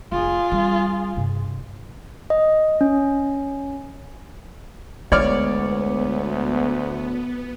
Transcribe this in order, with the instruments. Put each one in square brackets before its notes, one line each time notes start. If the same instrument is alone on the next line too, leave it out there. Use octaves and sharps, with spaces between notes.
[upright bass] F1 [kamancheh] F4 G#4
[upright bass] G3 C4
G2 C3
[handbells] D#5
C#4
[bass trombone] D2 [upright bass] G#3 [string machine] B3 [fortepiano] C#5 D5 F6